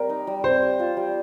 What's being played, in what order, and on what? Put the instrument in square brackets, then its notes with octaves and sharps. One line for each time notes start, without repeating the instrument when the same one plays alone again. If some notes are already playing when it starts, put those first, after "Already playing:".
Already playing: [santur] G3 C4 G4 [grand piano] A#4
[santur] D#4
G3
[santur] C4 [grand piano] C5
[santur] G4
F4
G3